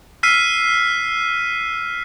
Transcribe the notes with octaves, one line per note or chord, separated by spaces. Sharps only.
E6 F6 B6 C7 D#7